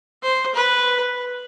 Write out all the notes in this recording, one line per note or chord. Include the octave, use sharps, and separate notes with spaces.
C5
B4